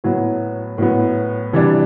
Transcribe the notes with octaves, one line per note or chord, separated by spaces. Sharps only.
A2 F#3 B3
A2 F#3 B3
C3 E3 G3 D4